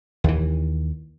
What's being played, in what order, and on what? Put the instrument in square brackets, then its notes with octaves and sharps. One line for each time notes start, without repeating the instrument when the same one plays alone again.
[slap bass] D#2 E3